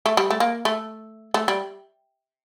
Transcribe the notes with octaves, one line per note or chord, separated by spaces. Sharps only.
A3
G3
A3
A#3
A3
A3
G3